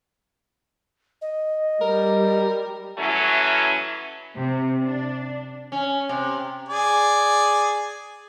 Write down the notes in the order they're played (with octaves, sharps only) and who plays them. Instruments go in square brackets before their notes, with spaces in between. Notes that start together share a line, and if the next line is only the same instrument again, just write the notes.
[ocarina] D#5
[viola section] G3 [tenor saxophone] A#4
[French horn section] E3 F#3 A3 C#4
[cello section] C3
D4
[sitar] C#4
C3
[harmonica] G#4 D5 G#5